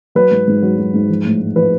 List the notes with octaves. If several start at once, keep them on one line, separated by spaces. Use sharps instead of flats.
F#3 B4
G#2
G#2
F#3
F#3
G#2
F3
A2
A2
F3 B4